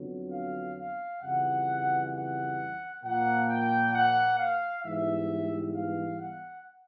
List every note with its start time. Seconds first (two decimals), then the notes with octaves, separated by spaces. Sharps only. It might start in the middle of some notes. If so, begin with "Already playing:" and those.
Already playing: F2 D3 F#3 B3
0.31 F5
0.76 F5
1.22 F2 C#3 E3 G3 F#5
2.12 F#5
3.03 A#2 F3 A#3 F#5
3.48 G5
3.93 F#5
4.38 F5
4.83 G#2 E3 G3 B3 E5
5.74 F5
6.19 F#5